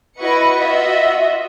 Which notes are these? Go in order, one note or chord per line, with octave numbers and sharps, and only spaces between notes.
E4 F#4 B4 D#5 C#6 C#7
F4 F#4 D#5 E5